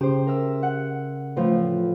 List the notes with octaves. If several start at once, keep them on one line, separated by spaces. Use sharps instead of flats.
C#3 G4 C5
A#4 E5 E6
F#5
A2 E3 F3